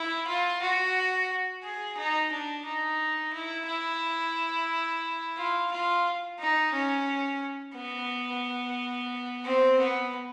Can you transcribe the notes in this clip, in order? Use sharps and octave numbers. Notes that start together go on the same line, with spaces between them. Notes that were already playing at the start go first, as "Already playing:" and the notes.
Already playing: E4
F4
F#4
G#4
D#4
D4
D#4
E4
E4
F4
F4
D#4
C#4
B3
C4
B3